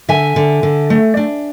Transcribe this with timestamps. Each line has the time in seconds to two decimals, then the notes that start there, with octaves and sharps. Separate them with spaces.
0.09 D3 E5 G#5
0.36 D3
0.63 D3
0.90 A3
1.17 D4